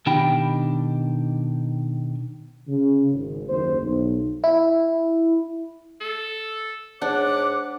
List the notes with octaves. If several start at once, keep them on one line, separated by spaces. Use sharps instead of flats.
B2 D#3 D4 G4 G5 B5
C#3
G#1
F#1 D#2 C5
B1
E4
A4
G#2 D4 C#5 F#5 D6